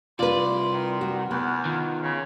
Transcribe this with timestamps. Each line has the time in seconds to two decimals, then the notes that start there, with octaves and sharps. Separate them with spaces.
0.19 C2 F4 B4 D5 C6
0.69 D#3
1.01 F#4
1.31 E2 B3 B5
1.65 D#3 F4
2.03 C#3